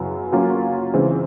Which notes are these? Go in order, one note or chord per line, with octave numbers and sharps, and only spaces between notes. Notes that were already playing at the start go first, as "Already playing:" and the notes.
Already playing: F#2 C#3 F#3 B3 E4
F#3 A#3 C#4 F4
C#3 E3 G#3 C4 E4